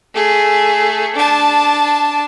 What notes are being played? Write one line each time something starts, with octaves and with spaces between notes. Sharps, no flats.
A3 G#4
D4 A5